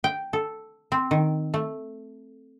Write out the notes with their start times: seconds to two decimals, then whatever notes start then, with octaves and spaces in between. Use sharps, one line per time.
0.04 G5
0.33 A4
0.92 C4
1.11 D#3
1.54 A3